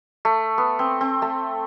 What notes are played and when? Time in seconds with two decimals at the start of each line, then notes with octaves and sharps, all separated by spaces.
0.25 A3
0.58 B3
0.79 C4
1.01 C4
1.22 A3